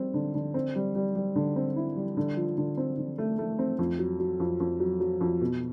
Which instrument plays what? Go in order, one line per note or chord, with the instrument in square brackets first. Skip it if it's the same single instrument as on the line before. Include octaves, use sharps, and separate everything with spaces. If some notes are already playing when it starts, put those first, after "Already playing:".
Already playing: [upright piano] G3 C4
D3
D3
C4
G3
G3
G3
D3
C4
E4
G3
D3
F3
D3
C4
D3
A3
A3
C4
F2
F#3
F#3
F2
F2
F#3
F#3
F2
B2